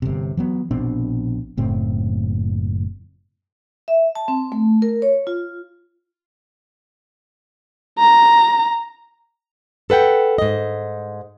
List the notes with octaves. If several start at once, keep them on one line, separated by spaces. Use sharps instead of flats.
G1 C3
E3 F#3 B3
A#1 B2 C4 D4
F#1 A2 C4
E5
A5
C4
A3
A#4
C#5
F4
A#5
A4 B4 F#5 G5
G#2 D#5